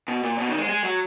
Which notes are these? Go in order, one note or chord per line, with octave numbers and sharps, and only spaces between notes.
B2
A#2
B2
D#3
G#3
G#3
F#3